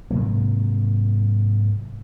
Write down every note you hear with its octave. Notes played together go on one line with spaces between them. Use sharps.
G#2 C3 F#3 A#3